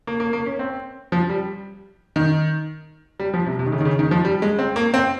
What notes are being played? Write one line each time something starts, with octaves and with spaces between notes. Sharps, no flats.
A#3
A#3
A#3
C#4
C4
F3
G3
D#3
G3
F3
C3
C3
D#3
C#3
D#3
C#3
D#3
F3
G3
G#3
C4
A#3
C4